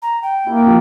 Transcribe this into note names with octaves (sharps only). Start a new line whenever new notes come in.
A#5
G5
A#3 E4
F3 C4